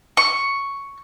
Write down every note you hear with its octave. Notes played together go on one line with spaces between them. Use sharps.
C#6